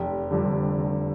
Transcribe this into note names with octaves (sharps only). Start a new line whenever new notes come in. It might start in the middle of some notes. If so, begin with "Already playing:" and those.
Already playing: F1 G4
F2 D3 G3
F1